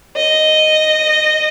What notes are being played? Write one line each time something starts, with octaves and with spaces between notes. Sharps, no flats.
D#5